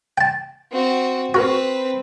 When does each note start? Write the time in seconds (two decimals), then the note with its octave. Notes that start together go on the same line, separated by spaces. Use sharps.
0.18 G5 A5
0.72 C4 F#4
1.34 C4 F#4 A#4 B4